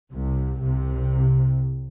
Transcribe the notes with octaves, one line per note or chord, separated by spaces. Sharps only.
C2 C3
C2 C3